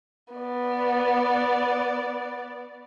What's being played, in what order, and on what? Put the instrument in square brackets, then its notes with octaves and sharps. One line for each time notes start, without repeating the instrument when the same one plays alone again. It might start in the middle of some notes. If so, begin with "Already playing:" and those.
[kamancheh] B3 D5